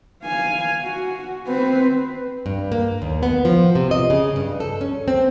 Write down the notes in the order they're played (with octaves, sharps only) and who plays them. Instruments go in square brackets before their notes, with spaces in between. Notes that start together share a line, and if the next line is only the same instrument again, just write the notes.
[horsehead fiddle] F5 G#5
F#4
C4 B4
[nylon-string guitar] G2
A#3
D#2
B3
F3
C3
D#5
C#3
G2
A4
C#4
C4